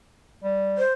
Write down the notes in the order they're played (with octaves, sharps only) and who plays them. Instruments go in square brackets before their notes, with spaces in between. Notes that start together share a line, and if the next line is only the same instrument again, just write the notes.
[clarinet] G3
[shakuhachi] C5